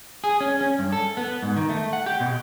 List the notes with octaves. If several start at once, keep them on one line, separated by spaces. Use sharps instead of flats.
G#4
C#4
C#4
G2
A4
B3
G#2
D#3
A3
F#5
G4
B2